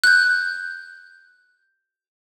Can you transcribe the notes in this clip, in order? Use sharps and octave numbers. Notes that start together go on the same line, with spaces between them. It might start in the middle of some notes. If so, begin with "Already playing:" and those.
F#6 G6